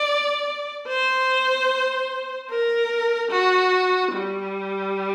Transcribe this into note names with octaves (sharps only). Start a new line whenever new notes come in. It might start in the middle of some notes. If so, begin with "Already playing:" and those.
Already playing: D5
C5
A#4
F#4
G3